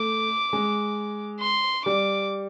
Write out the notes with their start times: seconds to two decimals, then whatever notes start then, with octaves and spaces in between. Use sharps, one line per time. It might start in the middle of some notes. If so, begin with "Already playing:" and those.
Already playing: A3 D6
0.53 G#3
1.41 C6
1.85 G3 D6